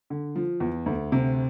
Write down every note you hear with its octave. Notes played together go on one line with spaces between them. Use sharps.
D3
F3
E2
D2
C3